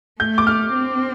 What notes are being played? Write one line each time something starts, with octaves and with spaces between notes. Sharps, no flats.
A3 G6
D6
F6
C4